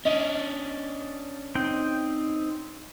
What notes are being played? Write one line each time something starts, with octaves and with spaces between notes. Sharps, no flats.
C#4 D4 D#5
C4 D#4 G5